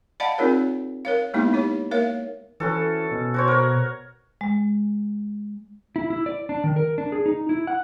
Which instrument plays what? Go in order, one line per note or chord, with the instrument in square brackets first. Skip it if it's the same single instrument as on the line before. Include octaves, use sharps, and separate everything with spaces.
[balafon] D5 D#5 F5 F#5 A5 B5
C4 D#4 F4 G#4 A#4 C#5
A#4 C#5 F5
G#3 A#3 B3 D#4 E4 G4
D#4 G4 C#5
A#3 A#4 C#5 E5 F5
[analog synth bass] E3 [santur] C#4 F#4 A4
[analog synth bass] B2
[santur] F#4 C5 C#5
A#4 C#5
[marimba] G#3
[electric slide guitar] E4
E4
D5
D4
D#3
A#4
D4
G#4
D#4
E4
F#5